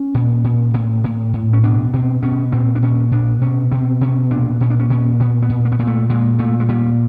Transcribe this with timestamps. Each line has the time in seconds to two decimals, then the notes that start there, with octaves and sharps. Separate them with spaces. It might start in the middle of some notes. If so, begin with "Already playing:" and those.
Already playing: C#4
0.15 A#2
0.44 A#2
0.74 A2
1.04 A2
1.33 A2
1.53 C#4
1.63 B2 D4
1.94 B2 C4
2.23 B2 C#4
2.52 A#2 C4
2.75 D4
2.82 A#2 C#4
3.12 A#2 D4
3.41 B2 C#4
3.72 B2 C4
4.01 B2 C#4
4.31 A#2 D4
4.61 A#2 C#4
4.70 D4
4.80 C#4
4.90 A#2 C#4
5.20 A#2 B3
5.43 B3
5.50 A#2
5.65 A#3
5.72 B3
5.79 A#2 A#3
5.87 A3
6.10 A#2 G#3
6.39 A#2 A3
6.60 G#3
6.69 A#2 G3